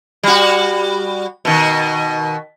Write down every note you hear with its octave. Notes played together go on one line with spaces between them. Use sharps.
G3 F#4
B2 D#3